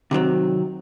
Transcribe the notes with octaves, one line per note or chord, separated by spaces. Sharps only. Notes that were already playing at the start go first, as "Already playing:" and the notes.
C3 D#3 F#3 C4